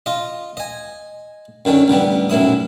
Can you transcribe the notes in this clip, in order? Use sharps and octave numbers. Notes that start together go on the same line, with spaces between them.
F4 D#5
D#5 G#5
F#2 D3 D#3 C#4
A1 D3 G3 B3
B1 F#2 A2 E4 D#6